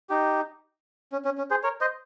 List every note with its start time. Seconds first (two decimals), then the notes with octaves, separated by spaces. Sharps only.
0.10 D#4 G4
1.12 C#4
1.25 C#4
1.38 C#4
1.51 G#4 C5
1.63 A#4 C#5
1.81 C5 D#5